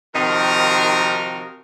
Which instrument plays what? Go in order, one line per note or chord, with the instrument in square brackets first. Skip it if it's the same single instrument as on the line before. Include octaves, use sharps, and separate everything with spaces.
[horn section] C3 D#3 F3 D#4 F#4 A#4